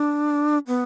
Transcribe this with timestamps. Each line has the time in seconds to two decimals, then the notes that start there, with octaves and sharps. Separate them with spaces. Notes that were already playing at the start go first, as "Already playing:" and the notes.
Already playing: D4
0.67 B3